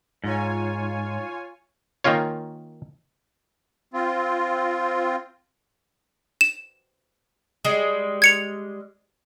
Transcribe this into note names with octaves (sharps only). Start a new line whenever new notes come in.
G#2 F4 C#5 G#5
D#3 A#3 C#4 F4 C#5
C4 F4
E7
G3 G#3
G#6 C#7 F7